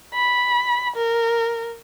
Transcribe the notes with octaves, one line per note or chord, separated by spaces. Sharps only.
B5
A#4